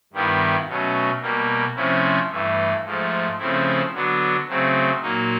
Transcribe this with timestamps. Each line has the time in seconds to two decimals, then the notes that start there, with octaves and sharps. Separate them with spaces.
0.13 G2 D#3 G3 B3 E4
0.67 B2 F#3 A3 C#4
1.22 B2 G3 A#3
1.76 C3 F3 A3 C#4 E4
2.30 G2 E3 A3
2.84 G#2 F3 A3
3.39 C#3 F3 A3 C4 E4
3.93 D3 F#3 B3 D4
4.48 C#3 F#3 A3 C4
5.01 A#2 F#3 A#3 D#4